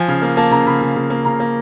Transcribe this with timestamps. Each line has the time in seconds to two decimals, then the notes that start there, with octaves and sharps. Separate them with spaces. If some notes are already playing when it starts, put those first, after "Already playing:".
Already playing: F3 G#5
0.08 C#3
0.22 A#3
0.37 A#3 A5
0.51 C#3 A#5
0.66 C#3 B5
0.82 C#3
0.96 C#3
1.10 A#3
1.25 C#3 A#5
1.40 A#3